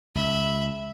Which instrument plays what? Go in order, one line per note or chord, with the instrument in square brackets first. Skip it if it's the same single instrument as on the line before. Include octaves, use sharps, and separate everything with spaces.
[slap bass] C#2 [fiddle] E5 B5